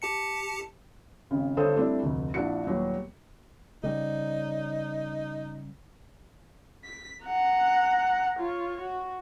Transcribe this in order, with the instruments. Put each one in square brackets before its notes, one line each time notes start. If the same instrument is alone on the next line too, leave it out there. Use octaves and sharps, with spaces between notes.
[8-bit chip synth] G4 A5 C#7
[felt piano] G#1 C#3
G1 G2 A4 C5 C#5 D#6
G3 A3 C4 D4 E4
F1 D2
A#1 D4 E4 F#4 C#7
D#2 A#2 F#3 G3 B3
[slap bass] C#3 G3 [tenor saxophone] D#4
[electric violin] B6
F#5 A#5
F4 C#5
F#4